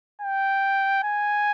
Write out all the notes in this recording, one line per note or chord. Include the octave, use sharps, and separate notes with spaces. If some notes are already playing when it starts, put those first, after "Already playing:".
G5
G#5